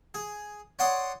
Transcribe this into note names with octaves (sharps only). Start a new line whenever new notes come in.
G#4
C#5 D5 F#5 C6 D#6